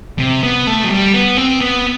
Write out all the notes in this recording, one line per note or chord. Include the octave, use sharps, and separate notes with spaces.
C3
B3
A3
F#3
G3
B3
C4
B3